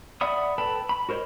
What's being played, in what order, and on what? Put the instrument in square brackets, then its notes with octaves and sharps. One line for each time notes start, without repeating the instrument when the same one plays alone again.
[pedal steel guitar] D5 E5 F#5 B5 D#6
A4 B4 G5 A5 B5
B5
F#4 A#4 C5 C#5 D#5